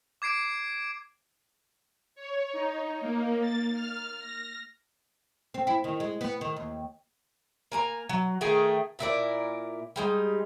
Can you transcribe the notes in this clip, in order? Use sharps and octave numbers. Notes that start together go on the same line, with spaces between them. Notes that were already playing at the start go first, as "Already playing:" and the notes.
D6 G#6 C7 D7
C#5
D#4
A#3
A6
F6
A#6
C4
E4
D#3
G#3
B3
D#3
D#2
A#3 G#5 A#5
F#3
D#3 A3 G#4 G5
A#2 E4 A#4 D5
G3 G#3 D#4